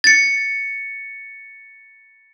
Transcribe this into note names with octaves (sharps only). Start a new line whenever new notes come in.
A6 C#7